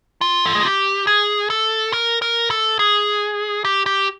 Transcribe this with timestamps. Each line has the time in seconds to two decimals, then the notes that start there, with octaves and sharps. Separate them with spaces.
0.21 F4
0.46 A4
0.55 G#4
0.64 G4
1.07 G#4
1.50 A4
1.93 A#4
2.22 A#4
2.51 A4
2.79 G#4
3.65 G4
3.86 G4